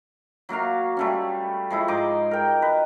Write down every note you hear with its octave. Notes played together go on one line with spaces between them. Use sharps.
F#3 A#3 F#4 F5
G3 A3 C#4
F3 G#3 E4
G#2 D#4 D#5 D6
A#4 G5
B4 D#5